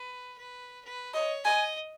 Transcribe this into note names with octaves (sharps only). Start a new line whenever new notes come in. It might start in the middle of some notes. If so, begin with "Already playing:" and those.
Already playing: B4
B4
B4
C#5 D#5
D#5 G#5